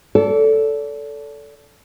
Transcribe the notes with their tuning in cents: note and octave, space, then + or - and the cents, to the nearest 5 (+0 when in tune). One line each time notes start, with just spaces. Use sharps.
A4 +0 D5 -35